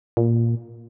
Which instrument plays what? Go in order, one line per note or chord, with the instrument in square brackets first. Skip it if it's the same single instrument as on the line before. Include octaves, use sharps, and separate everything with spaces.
[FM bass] A#2